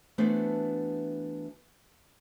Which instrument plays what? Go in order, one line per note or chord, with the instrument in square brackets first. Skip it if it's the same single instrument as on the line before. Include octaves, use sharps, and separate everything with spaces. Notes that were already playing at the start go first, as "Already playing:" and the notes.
[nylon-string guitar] E3 A3 B3 D4 F#4 C5